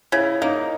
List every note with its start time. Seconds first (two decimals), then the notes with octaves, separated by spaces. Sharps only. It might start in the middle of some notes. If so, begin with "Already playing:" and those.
0.12 C#3 E4
0.41 A#3 D#4